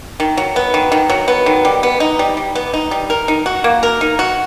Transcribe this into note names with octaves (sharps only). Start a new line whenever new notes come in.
D#3
F#3
B3
D#3
D#3
F#3
B3
D#3
G3
B3
D#4
G3
G3
B3
D#4
G3
A#4
D#4
F#4
A#3
A#4
D#4
F#4